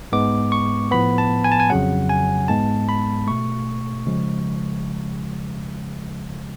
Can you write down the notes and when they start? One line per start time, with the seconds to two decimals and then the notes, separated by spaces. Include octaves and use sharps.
0.12 G#2 G#3 B3 D6
0.52 C#6
0.91 A2 F3 B3 B5
1.18 A5
1.44 G#5
1.52 A5
1.60 G#5
1.70 F2 C#3 F#3 F#5
2.09 G#5
2.48 G#2 G#3 B3 A5
2.89 B5
3.27 B2 A3 C#6
4.07 C#3 F3 G#3